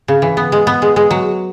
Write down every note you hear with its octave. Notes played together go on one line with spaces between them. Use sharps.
C#3
E3
B3
G#3
B3
G#3
G#3
F#3